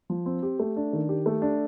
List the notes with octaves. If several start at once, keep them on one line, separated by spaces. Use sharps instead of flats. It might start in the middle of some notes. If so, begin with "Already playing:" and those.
F3
C4
G4
A3
D4
D#3
G4
A3
D4